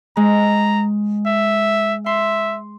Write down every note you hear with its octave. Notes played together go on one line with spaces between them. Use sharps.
G#3 A#5
E5
E5 C6